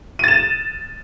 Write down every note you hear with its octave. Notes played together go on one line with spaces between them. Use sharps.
A6 D#7 E7